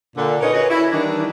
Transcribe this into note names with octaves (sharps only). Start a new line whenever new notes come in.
A#2 D3
C#4 D#4 A#4 B4 C#5 D#5
F#4 G#4 A#4 B4 C#5 D#5
E4
D#3 E3 G3 D4